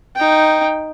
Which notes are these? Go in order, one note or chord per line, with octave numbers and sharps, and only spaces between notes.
D#4 G5